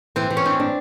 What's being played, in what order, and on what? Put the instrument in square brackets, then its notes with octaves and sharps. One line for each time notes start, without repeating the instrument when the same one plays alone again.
[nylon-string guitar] E3 [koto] C4
[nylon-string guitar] E3
[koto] C#4
[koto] C4 [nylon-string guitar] D4
[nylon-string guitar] D4